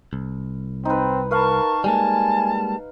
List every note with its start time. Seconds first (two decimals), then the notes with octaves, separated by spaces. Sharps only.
0.13 C2
0.85 C4 D#4 B4
1.31 A#4 B4 F5 F#5 A5 C#6
1.84 G3 G#3 A#3 G#5 A5